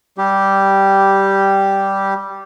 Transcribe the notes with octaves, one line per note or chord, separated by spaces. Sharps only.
G3 G4